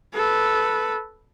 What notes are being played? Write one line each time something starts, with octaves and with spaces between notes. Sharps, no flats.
A4 B4